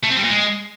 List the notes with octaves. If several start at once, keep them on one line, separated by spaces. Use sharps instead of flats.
A3
C4
G3
A#2
G#3